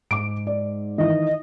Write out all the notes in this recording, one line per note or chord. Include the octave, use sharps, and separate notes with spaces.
G#2 D6 D7
D5
D#3 E3 D#5